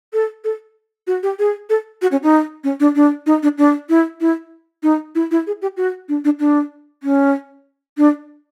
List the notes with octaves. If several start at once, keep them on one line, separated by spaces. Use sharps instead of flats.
A4
A4
F#4
G4
G#4
A4
F#4
C#4
D#4
C#4
D4
D4
D#4
D4
D4
E4
E4
D#4
E4
E4
G#4
G4
F#4
D4
D4
D4
C#4
D4